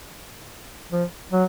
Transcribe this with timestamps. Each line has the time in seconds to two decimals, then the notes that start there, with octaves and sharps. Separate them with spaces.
0.92 F3
1.32 F#3